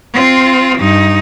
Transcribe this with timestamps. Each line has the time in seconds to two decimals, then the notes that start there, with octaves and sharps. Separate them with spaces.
0.13 C4 F4
0.78 G2 D#4